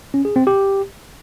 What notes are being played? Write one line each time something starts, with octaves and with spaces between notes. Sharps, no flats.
C#4
G#4
C4
G4